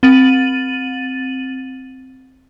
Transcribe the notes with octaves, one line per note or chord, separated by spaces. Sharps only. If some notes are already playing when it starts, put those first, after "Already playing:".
C4 A6 D#7 F#7